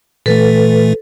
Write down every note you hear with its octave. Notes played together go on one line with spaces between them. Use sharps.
A#2 E3 A3 A4 B4